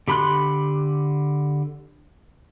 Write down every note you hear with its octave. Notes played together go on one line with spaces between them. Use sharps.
D3 G4 B5 C6 F#6